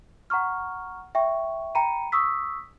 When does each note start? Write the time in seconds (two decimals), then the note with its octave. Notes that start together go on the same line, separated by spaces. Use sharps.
0.30 F#5 A#5 C#6 F6
1.15 E5 G5 C#6
1.75 G5 A#5 B5 C#7 D#7
2.12 C#6 D#6 E6 B6